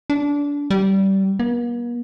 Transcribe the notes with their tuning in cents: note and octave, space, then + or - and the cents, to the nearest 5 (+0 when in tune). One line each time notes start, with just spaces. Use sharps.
D4 -25
G3 -20
A#3 +45